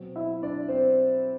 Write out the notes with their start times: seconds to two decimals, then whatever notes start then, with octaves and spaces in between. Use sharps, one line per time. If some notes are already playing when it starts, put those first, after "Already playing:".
Already playing: B2 F#3 C4
0.16 E4 E5
0.42 D4 D5
0.68 C4 C5